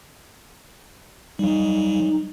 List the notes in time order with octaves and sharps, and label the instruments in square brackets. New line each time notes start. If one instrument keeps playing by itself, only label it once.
[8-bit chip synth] F#3 G3 [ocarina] D#4